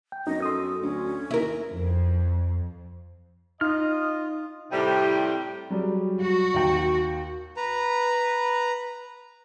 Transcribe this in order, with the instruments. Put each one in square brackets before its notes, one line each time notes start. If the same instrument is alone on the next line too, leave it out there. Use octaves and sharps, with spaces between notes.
[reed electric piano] G5
[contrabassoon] F#2 [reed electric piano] B3 D#4 [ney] D#5
[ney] A4 [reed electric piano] C6 D#6
[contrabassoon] D2 [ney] C#4
[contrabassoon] D#2 [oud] E4 A#4
[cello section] F2
[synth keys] D#4 [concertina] F4 [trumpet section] D#5 [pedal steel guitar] F6
[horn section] A2 C3 G3
[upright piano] F#3 G3 G#4
[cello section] F#4
[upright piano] D#2 G5
[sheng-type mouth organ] B4 A#5